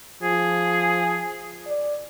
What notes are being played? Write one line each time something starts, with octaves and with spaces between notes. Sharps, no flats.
F3 G#4
D5